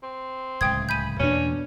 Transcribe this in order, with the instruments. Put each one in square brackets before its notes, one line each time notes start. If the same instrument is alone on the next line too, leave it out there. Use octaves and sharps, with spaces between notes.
[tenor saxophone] C4
[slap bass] D1 C#2 [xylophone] G5 D#6 G#6
[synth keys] G#5 B5 [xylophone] G6 D#7
[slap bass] E2 A#3 [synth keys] B2 D4 [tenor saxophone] C#4